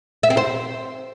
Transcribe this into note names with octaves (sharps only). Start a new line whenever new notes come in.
E5
C4
C5